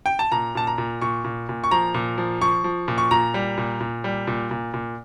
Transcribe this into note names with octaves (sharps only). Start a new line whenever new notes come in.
G5
A5
A#2 A#5
A#2 A5
A#5
A#2
A#2 C#6
A#2
A#2
C#6
F3 A#5
A#2
F3
F3 C#6
F3
A#2
C#6
A#2 A#5
G3
A#2
A#2
G3
A#2
A#2
A#2